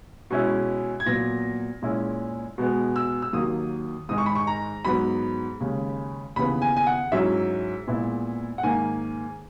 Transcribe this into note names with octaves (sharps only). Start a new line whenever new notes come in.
B2 G#3 C#4 E4
G#6
A#2 F#3 B3 A#6
A#2 G#3 C#4 E4
B2 G#3 B3
E6
E6
D#2 D#3 F#3 A#3 D#6
G#2 D#3 G#3 D#4 D#6
C#6
B5
C#6
A#5
G#2 F#3 B3 B5
D#2 C#3 G#3 C#4
D#2 C#3 E3 B3 B5
G#5
G#5
F#5
G#2 F#3 C#4 E4 E5
A#2 G#3 B3 E4
F#5
G#2 D#3 A#3 G#5